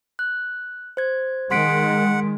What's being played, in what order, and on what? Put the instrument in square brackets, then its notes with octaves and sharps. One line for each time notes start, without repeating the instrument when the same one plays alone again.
[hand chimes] F#6
C5 G#6
[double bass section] D#3 G#3 [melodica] F#5 [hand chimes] C6 B6 D7